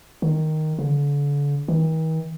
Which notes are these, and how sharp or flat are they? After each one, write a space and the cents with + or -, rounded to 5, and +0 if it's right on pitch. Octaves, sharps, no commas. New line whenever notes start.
D#3 +0
D3 -40
D#3 +45